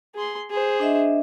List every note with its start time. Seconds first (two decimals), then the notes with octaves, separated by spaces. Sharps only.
0.14 G#4 C6
0.50 G#4 C5
0.79 D4 D#5 E5